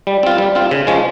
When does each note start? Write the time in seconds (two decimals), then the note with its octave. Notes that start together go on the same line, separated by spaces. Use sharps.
0.07 G3
0.23 C4 F4
0.38 G3
0.55 C4 F4
0.71 C#3
0.87 F3 G#3 C#4